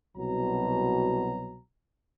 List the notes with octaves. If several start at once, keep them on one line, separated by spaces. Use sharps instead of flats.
C2 B2 F#3 A#5